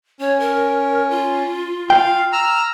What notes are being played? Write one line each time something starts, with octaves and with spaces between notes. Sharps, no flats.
C#4 C#5
A#4
F4
F5 G5
A#5 E6 F6